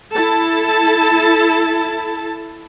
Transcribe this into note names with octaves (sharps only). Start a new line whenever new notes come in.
E4 A4 A5